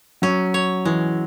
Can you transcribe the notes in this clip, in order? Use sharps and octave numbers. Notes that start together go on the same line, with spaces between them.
F#3 C#4
C#5
E3 G#3